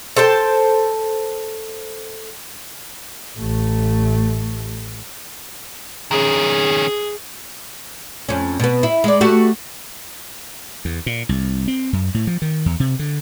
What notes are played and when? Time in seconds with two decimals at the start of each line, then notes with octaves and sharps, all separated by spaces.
0.16 A4 C5 G5 A5
3.38 A1 A3
6.11 D#3 C#4 G#4
8.29 F2 C#4
8.60 B2 B3
8.83 E4
9.04 G#3 D5
9.21 A3 F#4 G4
10.85 E2
11.06 A#2
11.29 C2
11.68 C4
11.93 F#2
12.14 A2
12.27 F3
12.42 D#3
12.66 E2
12.80 C3
12.99 D3